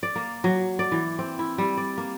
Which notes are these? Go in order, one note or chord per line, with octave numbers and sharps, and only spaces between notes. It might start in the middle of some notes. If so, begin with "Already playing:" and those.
D5
A#3
F#3
D5
E3
C4
E4
G3
D5
A#3